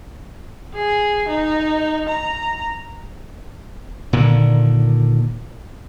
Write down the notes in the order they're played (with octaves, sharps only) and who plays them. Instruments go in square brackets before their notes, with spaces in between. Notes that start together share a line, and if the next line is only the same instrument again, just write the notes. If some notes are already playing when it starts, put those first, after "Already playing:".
[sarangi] G#4
D#4
A#5
[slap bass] A#2 D3 D#3